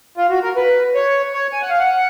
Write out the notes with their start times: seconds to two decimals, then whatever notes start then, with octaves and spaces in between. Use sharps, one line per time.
0.18 F4
0.30 F#4
0.43 A#4
0.56 B4
0.95 C#5
1.34 C#5
1.53 G#5
1.62 F#5
1.70 F5
1.79 F#5